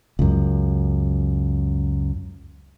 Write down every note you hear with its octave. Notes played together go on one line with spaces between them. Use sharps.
C#2 F#2